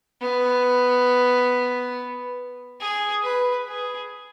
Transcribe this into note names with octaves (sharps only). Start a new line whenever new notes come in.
B3
G#4
B4
G#4